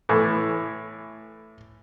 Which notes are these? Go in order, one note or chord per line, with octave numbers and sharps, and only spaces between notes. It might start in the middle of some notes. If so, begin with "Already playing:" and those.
A2 E3